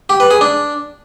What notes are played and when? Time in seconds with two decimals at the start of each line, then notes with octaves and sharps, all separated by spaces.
0.09 G4
0.20 B4
0.31 G#4
0.41 D4